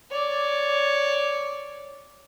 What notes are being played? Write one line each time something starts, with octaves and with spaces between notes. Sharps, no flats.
C#5 D5